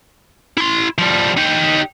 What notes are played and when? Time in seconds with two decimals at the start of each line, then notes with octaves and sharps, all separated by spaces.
0.58 E4 C6
0.99 F3 G3
1.37 D#4 G4